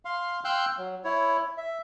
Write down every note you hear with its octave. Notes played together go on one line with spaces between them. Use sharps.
F5 C6
F5 G5 C6 E6 F#6 G6
F#3
E4 C#5
E5